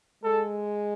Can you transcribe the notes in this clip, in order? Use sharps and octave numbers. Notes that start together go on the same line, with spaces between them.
G#3 A4